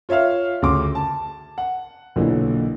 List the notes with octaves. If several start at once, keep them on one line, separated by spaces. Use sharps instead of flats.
F4 C#5 E5 F5 F6
D2 C#3 C#4 C6 D6
A5
F#5
B1 A#2 D3 E3